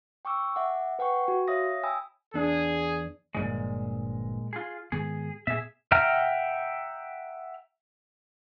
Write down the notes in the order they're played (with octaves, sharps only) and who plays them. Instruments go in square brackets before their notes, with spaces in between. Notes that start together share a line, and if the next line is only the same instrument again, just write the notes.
[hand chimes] G5 C#6 D6 E6
E5 F#5 D6
B4 F#5 G5 C#6
F#4
C#5 E5 F5 D#6 A#6
G5 G#5 B5 D#6 E6
[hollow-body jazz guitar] E2 D4 [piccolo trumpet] G#4
[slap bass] G1 G2 F3 [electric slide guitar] A#2 C#3 G#3
[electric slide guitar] F4 G#4
[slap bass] G#2 D#3 B3 [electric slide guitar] G#4
[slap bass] A#2 B3 [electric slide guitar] G#4 E5
[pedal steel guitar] E5 F#5 G5 A#5 F6